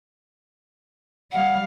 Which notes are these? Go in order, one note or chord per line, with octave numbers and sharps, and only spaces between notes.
G3 F5 F#5